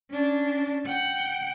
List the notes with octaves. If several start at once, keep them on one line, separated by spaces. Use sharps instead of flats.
C#4 D4
F#5 G5